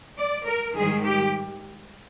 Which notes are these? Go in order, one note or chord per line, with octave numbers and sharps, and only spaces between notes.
D5
A#4
G#2 D#3 G3 G#4
G4